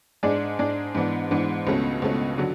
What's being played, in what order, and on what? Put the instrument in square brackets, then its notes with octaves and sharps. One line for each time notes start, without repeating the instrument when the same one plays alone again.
[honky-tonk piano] G#2 G#3 D4 G#4 D5
G#2 G#3 D4 G#4 D5
G#2 E3 B3 D4
G#2 E3 B3 D4
C#2 B2 A3 C#4
C#2 B2 A3 C#4
D3 F#3